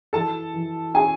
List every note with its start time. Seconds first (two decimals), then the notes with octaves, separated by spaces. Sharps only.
0.13 E3 A4 A5
0.54 E3
0.94 C#4 G#4 G#5